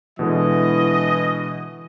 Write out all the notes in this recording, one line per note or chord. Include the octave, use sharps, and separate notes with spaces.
B2 D3 E3 G#3 D#5